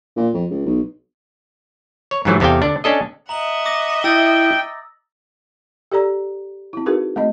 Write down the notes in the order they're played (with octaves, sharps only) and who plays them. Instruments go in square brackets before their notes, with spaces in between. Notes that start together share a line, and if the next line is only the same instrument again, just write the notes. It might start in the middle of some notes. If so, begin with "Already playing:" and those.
[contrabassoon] A#2
F2
C#2
B1
[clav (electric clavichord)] C#5
G#2 C3 E3 F#3 A3
E2 C3 A4 F5 G5
D3 D4
C#4 D4 A4 D#5
[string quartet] D#5 E5 F#5 [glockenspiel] A#5 F#7
[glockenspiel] D6 D#6 A#6
[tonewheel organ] E4 [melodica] G5 [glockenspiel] E6 A6 A#6
[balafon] G4 A4 D5 A#5
C4 E4
D#4 F#4 G#4 A#4 B4
A3 C4 D#5